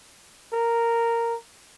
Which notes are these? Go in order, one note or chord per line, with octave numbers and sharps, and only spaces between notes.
A#4